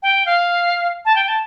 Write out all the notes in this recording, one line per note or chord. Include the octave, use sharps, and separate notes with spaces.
G5
F5
A5
G5
A5